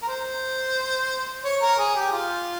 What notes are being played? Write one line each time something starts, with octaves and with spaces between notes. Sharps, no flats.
A#4
C5
C#5
A#4
G#4
G4
F4